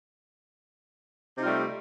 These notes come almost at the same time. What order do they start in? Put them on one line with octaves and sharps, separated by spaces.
C3 D#4 F4 G3 A3